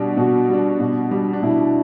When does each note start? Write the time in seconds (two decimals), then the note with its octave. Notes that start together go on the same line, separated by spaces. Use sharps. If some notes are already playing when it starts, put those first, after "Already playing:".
Already playing: B2 G3 D4 G4
0.17 B2 F#4
0.49 G3 D4
0.80 B2
1.11 G3 D4
1.33 D4
1.43 B2 E4